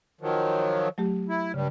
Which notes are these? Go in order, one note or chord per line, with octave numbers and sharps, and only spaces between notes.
D#3 F3 F#3
F#3 A3 G4
E4
G2 C#3 G3